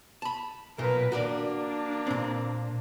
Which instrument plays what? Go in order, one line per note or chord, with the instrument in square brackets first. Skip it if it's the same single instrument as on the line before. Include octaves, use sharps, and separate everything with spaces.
[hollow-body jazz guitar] A5 B5
[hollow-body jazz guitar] B1 A#2 [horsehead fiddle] A#4 B4
[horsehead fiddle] A#3 D4 [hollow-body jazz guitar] F#4 A#4 D5
[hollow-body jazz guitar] A#2 C4